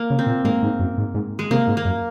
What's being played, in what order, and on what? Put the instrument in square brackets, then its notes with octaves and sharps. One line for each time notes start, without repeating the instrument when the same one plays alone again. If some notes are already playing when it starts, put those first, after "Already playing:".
Already playing: [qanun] A#3
[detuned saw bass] C#3
[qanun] C4
[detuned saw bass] A#2
[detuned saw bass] G#2 [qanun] A#3
[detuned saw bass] G#2
F#2
G#2
G#2
[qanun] G#3
[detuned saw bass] C3 [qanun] A#3
[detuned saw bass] G#2
[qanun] A#3
[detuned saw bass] F#2